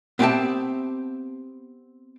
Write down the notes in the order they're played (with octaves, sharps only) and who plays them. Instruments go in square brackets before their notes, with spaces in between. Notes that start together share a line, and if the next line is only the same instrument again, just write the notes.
[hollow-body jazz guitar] B3 C4 G4 E5 G5 A5